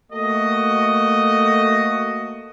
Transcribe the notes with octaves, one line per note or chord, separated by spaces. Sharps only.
A3 A#3 F#4 D#5